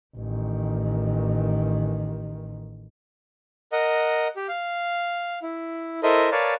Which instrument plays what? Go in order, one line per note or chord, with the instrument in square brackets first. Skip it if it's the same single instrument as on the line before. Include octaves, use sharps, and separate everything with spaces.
[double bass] A1 D#3
[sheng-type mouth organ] A#4 D#5 F#5
G4
F5
E4
E4 A4 A#4 C5 D#5 E5
A#4 B4 C#5 D5 F5 A5